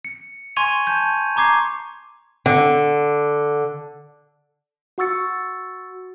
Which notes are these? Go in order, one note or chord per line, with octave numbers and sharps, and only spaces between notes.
C#7
G#5 C6 C#6 G#6 D#7 F7
A5 G6
A#5 C#6 D6 G#6 C7
D3
F#4 F#5 C#6 E6 A6 C#7